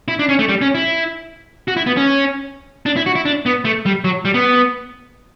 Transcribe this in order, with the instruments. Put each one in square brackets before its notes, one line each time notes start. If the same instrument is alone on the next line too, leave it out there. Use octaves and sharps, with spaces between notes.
[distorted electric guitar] E4
D4
C#4
A3
G3
C#4
E4
F#4
E4
B3
C#4
D4
E4
F#4
E4
D4
B3
A3
G3
F#3
G3
B3